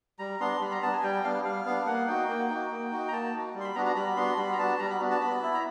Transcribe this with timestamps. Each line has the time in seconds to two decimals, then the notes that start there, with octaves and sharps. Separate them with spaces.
0.19 G3 A#5
0.40 B3 D4 C6
0.61 G3 B5
0.71 A#5
0.82 B3 D4 A5
0.93 G#5
1.03 G3 G5
1.24 B3 D4 F5
1.44 G3 F5
1.66 B3 D4
1.86 A#3 F#5
2.07 D#4 F#4 G5
2.29 A#3
2.50 D#4 F#4
2.71 A#3
2.92 D#4 F#4
3.08 A#5
3.12 A#3 A5
3.33 D#4 F#4
3.54 G3
3.60 C6
3.64 B5
3.75 B3 D4 F#4 A#5
3.86 A#5
3.96 G3 B5
4.16 B3 D4 F#4 C6
4.37 G3 B5
4.53 A#5
4.58 B3 D4 F#4 A5
4.79 G3 A#5
4.90 B5
5.00 B3 D4 F#4
5.11 A5
5.21 B3 B5
5.42 E4
5.54 A#5